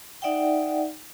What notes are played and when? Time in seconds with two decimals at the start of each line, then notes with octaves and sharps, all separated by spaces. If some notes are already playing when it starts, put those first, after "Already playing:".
0.22 D#4 D5 E5 F#5 G5